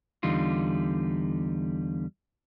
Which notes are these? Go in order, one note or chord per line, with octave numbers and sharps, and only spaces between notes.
E2 D3 G3 D#4 F4